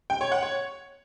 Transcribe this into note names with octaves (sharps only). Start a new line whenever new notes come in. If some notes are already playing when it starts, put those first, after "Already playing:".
G5
C#5
F#5
C#5